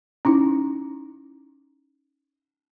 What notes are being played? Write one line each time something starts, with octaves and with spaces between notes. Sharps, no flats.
C#4 D#4 E4